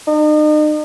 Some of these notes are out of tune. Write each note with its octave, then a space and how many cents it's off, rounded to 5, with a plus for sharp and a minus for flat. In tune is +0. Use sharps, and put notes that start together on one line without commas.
D#4 -40